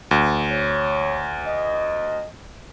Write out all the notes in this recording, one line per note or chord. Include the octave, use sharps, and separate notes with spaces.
D2
C#5
D#5